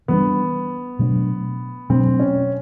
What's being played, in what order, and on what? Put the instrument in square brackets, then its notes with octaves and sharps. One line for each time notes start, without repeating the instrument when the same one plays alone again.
[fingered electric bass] E3 G3 A#3 D4 [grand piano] B3
[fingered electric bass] B2 F#3 A3 D4
[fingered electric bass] B2 F#3 A3 D4 [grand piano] C4
[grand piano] C#4